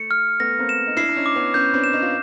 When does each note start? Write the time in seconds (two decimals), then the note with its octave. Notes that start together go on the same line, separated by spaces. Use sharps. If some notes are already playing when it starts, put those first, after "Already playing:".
Already playing: A3 C#7
0.11 F6
0.40 A3 B3 A#6
0.59 A#3 C4
0.69 E7
0.87 D#4
0.97 D4 E4 C7
1.09 D4
1.16 C#4 D#4
1.26 D6
1.35 B3 C#4
1.54 B3 C#4 G6
1.73 C4 D4
1.84 E7
1.93 C#4 D#4
2.02 F4